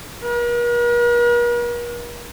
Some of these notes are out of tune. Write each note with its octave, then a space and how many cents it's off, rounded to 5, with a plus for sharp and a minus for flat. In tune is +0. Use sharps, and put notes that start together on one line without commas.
A#4 +45